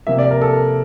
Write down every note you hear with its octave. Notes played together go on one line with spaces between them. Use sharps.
C3 F3 A#3 E5
D5
A#4
A4
A#4